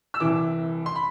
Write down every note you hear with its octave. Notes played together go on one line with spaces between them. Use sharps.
E6
C2 C3 E3 D6
C6
B5